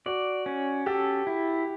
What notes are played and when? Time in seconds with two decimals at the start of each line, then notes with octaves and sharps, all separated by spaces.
0.06 F#4 D5
0.46 C#4
0.86 G4 A4
1.27 E4